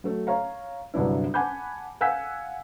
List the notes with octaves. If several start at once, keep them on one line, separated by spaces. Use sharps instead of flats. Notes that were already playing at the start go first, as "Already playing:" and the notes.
F#3 A3
C#5 F5 A#5
G1 C2 F#3 D4 E4
F#5 G#5 A5 B5 D6 G6
F5 F#5 G#5 E6 G6 B6